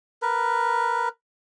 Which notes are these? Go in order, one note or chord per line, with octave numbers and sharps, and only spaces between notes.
A#4 B4